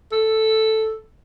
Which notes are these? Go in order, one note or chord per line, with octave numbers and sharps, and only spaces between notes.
A4